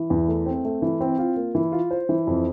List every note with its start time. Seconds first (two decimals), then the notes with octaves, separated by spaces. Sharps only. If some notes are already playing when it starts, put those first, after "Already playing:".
Already playing: E3
0.10 E2
0.28 A3
0.46 C4
0.65 A3
0.82 E3
1.01 C4
1.19 F4
1.36 A#3
1.55 E3
1.72 F4
1.91 C5
2.09 E3
2.27 F2